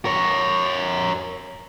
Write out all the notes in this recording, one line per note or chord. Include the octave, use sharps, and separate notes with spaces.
A#4 C#5